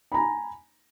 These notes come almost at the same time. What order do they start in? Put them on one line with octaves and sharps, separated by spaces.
B5 A#5 G#5